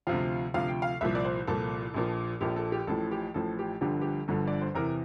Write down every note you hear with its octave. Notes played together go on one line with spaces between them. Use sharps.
D2 C3 F3 F5
D2 C3 F3 F5
G5
F5
C2 A#2 F3 E5
D5
C5
C2 A#2 F3 A4
A#1 A#2 F3
A#1 A#2 F3 G4
A4
G4
A1 A2 F3 A4
G4
A1 A2 F3 A4
G4
G1 G2 D3 F3 G4
G4
G1 G2 D3 F3 A4
D5
C5
E2 C3 E3 A#4